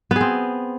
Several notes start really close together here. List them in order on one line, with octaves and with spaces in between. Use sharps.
B3 G#4 C4